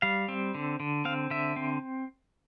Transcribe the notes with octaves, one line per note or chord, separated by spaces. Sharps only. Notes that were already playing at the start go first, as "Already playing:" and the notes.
G3 F5
C4
D3
D3
C4 F5
D3 E5
C4